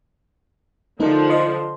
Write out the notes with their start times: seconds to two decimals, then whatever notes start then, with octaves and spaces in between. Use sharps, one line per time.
1.00 D3 F3 A3 D#4 A#4
1.29 C5 D#5 C6